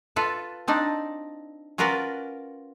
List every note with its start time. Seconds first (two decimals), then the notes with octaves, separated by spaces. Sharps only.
0.16 F4 A4 B4
0.68 C4 D4 D#4 D5
1.78 C#4 F4 F#4 A#4 B4 D5